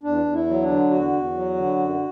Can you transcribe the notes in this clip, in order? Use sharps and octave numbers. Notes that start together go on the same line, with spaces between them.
E2 D4
E2
E4
F#3
D4
D3
E2 F#4
E2
F#3
D3
F#2